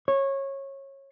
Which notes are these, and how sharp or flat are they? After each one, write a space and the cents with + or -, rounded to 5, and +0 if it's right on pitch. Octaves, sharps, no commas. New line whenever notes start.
C#5 -20